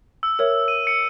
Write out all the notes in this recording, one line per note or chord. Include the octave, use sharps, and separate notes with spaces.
E6
A#4 C#5 E5
D#7
C#7